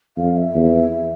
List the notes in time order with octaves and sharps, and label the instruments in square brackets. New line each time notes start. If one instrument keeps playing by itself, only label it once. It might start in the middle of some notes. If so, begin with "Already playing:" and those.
[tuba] F2 [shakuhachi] F5
[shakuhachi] E5
[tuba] E2